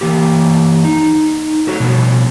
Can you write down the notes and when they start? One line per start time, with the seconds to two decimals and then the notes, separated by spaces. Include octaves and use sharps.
0.01 E3 A#3 G4
0.84 D#4
1.67 A3 F#4 C#5
1.80 B2 F3 B3